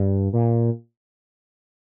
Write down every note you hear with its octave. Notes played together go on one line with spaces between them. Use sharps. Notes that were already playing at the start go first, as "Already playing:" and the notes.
Already playing: G2
A#2